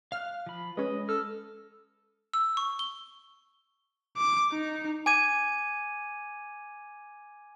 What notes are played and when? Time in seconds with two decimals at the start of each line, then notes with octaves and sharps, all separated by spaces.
0.12 F5 F6 F#6
0.46 F3 B5
0.77 G#3 C#4 B4 D#5
1.09 A4 F6
2.34 E6
2.57 C#6
2.79 G7
4.17 D6
4.52 D#4
5.06 G#5 D6 G#6 D#7